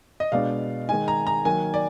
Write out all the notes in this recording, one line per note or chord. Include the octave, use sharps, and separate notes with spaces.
D#5
B2 G#3 D4 F5
D#3 G#3 D#4 G#5
A#5
A#5
D#3 F#3 A#3 G#5
D5